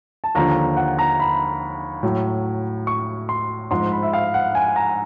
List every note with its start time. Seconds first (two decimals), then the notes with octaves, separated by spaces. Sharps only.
0.24 A5
0.35 D#2 D3 F3 A#5
0.77 F#5
0.99 A#5
1.20 B5
2.03 A2 F#3
2.87 C#6
3.29 C6
3.71 G#2 F3 C6
3.92 B5
4.03 E5
4.13 F5
4.34 F#5
4.55 G#5
4.76 A#5